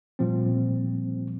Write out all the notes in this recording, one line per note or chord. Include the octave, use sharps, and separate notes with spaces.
A#2 F3 G3 C4